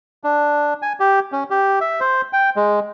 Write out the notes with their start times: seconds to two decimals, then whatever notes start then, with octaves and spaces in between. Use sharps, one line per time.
0.24 D4
0.82 G#5
1.00 G4
1.32 C#4
1.50 G4
1.81 E5
2.00 C5
2.33 G5
2.56 G#3